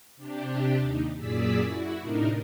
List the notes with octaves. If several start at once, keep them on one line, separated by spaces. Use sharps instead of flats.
C3 D4 G4
D#2 D#4
F#2 A#2 G#4 D5 E6 B6
E4 F#4
A2 C3 D4 D#4 A#4